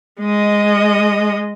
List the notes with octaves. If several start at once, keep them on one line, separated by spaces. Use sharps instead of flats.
G#3 D#5